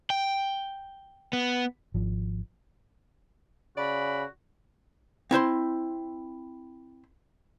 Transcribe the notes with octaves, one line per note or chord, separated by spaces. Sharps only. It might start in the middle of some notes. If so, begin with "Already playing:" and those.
G5
B3
G#1 F3
C#3 F#4 D5 B5
C4 E4 C5 C6